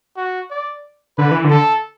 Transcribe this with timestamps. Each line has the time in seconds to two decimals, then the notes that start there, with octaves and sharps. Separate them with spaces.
0.17 F#4
0.50 D5
1.18 D3 B4
1.31 E3
1.44 D3
1.51 A4